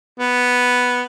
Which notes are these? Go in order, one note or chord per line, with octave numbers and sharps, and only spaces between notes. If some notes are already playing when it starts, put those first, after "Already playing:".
B3